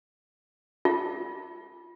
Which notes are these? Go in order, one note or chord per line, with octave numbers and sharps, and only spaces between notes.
F4